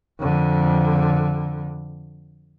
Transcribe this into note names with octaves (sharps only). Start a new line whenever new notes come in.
F2 D3